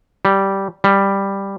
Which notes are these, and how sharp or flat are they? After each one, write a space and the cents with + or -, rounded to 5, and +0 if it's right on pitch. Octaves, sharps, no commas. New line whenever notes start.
G3 -10
G3 +5